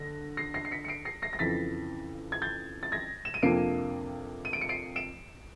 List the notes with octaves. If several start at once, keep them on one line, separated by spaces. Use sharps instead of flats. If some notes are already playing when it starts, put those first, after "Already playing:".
Already playing: D3 A#6
A#6 C7
A#6 C7
C7
B6 C#7
C#7
C7 D7
A#6 C7
A#6 C7
A#6
F2 C#3 E3 A6 B6
G#6
G6 A6
A6
G#6 A#6
E7
D#7
F2 C3 F3 A#3 D4 C7 D7
D#7
D7
C#7
C7 D7
D7 E7